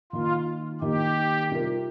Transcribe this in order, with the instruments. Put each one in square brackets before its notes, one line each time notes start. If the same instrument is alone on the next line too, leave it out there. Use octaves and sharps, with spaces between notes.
[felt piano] D#3 A#3 D#4 [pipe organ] F4
[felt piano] D#3 A#3 D#4 [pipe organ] G4
[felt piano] C3 G3 C4 F4 A#4